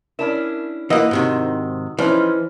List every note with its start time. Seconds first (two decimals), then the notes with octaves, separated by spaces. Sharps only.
0.19 C#4 D4 E4 A#4 E7
0.90 E3 A#3 F#4 D#5 F#5 D#6 E6
1.11 G#2 C3 D#3
1.99 E3 F3 C#4 D#4 C5 D5 F6